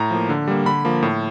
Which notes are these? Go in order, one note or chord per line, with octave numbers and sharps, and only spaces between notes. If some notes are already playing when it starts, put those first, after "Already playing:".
Already playing: A2 A#5
F3 A#3
D3
G3 A#3
D3 B5
F3 A#3
A2